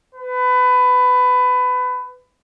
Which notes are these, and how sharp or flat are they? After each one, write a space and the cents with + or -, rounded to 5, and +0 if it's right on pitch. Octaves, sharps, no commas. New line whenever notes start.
B4 +20